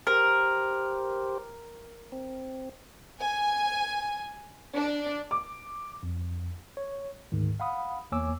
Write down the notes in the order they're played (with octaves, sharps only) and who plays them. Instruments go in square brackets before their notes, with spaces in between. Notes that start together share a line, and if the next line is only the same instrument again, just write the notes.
[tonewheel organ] G4 C5 [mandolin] A#4
[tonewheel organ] C4
[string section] G#5
D4
[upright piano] D6
[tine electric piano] F2
C#5
D2 G#2 D#3
F5 F#5 B5 D#6
E2 A#3 C#5 G#5 D6 E6